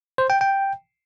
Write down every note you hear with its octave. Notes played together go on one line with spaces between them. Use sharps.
C5
G5
G5